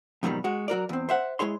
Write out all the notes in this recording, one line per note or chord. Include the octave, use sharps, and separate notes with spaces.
F2 G#2 B2 D#3 F#3 G3
G#3 F#4
F#3 F#4 A#4 D5
E2 C4
C5 E5 F#5
G#3 E4 G#4 C#5 C6